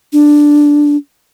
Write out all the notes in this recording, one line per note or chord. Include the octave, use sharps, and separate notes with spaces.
D4